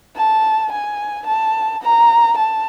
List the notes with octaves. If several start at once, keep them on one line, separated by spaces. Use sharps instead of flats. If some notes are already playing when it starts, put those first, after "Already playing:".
A5
G#5
A5
A#5
A5